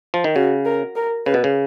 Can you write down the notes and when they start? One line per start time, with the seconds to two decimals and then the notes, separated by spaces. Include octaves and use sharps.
0.14 F3
0.24 D#3
0.35 C#3 F#4
0.65 A#4
0.96 A#4
1.26 C#3 B4
1.34 B2
1.44 C#3